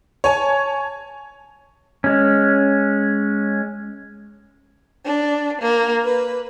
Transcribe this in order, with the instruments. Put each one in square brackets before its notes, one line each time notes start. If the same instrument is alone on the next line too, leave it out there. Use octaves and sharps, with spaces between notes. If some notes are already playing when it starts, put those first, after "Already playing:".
[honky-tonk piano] C#5 G#5 A5
[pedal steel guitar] G#3 C#4
[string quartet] D4
A#3
B4